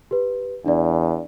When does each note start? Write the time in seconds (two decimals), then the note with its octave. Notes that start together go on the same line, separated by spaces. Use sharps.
0.11 G4 B4
0.66 E2 D4 D5